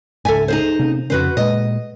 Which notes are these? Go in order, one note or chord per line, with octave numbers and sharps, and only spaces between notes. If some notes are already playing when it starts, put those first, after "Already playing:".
C#2 G#2 A4 E5 G#5
D#4 G#4 C5
C3 A#3 C#4
F2 C#3 C#4 F#4 B4 C5
A#2 G#3 D#5